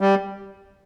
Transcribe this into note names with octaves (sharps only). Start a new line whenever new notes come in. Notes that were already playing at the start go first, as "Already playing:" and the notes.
G3